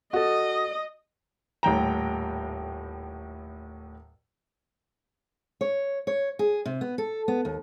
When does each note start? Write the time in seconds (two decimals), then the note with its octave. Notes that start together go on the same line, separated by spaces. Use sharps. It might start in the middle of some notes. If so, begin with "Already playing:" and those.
0.13 F#4 A4 D#5
1.63 D#1 A2 G5 A#5
5.61 C#5
6.07 C#5
6.39 G#4
6.65 C3
6.81 B3
6.98 A4
7.28 B3
7.45 D#2